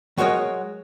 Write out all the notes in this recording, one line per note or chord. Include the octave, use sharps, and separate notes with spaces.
F#3 G#3 F#4 A#4 C#5 D#5